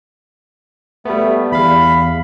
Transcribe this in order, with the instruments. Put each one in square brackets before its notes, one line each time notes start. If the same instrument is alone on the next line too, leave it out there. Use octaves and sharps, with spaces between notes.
[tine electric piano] G3 B3 [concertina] A3
[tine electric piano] E2 F5 [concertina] B5